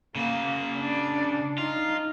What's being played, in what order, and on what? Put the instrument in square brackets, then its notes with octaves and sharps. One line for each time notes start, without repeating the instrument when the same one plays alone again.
[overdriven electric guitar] C#3 F#4 [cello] A#3
[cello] D4 D5
[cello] D#4 [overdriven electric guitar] F4